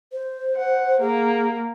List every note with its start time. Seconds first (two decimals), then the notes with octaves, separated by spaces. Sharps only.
0.13 C5
0.55 F#5
1.01 A#3 G#4